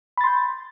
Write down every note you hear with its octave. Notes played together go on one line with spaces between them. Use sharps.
B5 C6 G6 A6